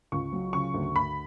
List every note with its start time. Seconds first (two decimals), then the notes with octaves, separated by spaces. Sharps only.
0.12 C#2 C#6
0.33 F#3
0.53 C#3 C#6
0.74 D2
0.95 D2 B5